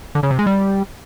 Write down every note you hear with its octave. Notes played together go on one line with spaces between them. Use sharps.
D3
C#3
C3
G#3
G3